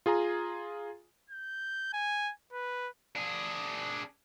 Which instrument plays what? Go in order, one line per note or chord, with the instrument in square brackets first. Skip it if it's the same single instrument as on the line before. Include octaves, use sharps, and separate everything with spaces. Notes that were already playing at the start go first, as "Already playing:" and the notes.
[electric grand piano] F4 G#4 G#5 A#5
[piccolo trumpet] G6
G#5
B4
[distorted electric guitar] D4 G#4